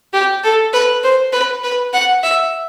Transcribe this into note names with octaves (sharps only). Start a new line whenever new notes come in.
G4
A4
B4
C5
B4
B4
F#5
E5